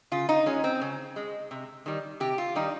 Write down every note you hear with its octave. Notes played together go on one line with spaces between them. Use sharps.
C#3 F4
D#4
G#3 C#4
C4
C#3
G#3
C3
D#3 G3
C3 G4
F4
D#3 G3 D#4